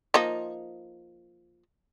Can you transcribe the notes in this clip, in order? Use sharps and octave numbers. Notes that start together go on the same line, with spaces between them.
F3 A#3 D#4